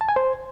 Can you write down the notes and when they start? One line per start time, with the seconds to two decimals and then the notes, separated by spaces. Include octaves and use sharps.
0.01 A5
0.09 G#5
0.16 C5